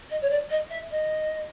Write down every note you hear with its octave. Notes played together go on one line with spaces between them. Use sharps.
D#5
C#5
D5
D#5
E5
D#5